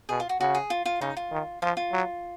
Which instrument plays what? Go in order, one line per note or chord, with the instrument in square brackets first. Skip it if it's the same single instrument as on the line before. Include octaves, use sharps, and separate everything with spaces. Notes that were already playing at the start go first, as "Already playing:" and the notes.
[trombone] B2 [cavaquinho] G#4
[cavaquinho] F4
F#4
[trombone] C#3 [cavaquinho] F#4
[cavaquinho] G#4
F4
F4
[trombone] C#3 [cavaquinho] D#4
[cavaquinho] F4
[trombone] D#3
[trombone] F3 [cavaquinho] F4
[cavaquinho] F4
[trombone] F#3